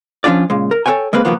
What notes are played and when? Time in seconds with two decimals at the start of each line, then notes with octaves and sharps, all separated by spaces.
0.24 F3 C#4 D4 F4 D5
0.50 A#2 C#3 G#3
0.71 A#4
0.86 A4 B4 C#5 G5 G#5
1.13 G#3 A#3 C4 B4
1.25 C2 B2 D#3 F3 A#3 B3